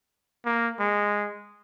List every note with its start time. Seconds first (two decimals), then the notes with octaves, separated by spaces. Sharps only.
0.45 A#3
0.80 G#3